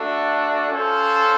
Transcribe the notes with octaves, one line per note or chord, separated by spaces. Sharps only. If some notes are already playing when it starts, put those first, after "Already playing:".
Already playing: A3 D4 F#4
C#4 F4 A4 C5